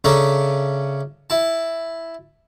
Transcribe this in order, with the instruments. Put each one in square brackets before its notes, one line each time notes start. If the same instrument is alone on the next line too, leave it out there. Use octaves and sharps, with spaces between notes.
[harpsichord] C#3 C#4 D4 A4 E5 A#5
E4 A5